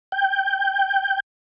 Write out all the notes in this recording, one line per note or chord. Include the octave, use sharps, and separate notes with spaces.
G5